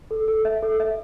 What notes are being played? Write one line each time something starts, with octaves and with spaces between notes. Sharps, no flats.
A4
A4
E5
A4
E5